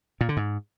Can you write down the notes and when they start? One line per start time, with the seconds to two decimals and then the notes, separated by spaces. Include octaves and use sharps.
0.21 A#2
0.29 D3
0.37 G#2